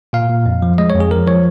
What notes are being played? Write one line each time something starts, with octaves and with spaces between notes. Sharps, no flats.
A#2 F5
A#2
F2
F3
G#3 D#5
C#5
F2
G#4
F3 A#4
F3 C#5